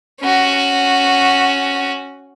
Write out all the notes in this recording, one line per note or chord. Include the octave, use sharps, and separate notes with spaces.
C#4 F#4